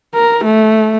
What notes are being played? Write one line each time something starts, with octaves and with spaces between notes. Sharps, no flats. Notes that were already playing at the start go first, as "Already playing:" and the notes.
A#4
A3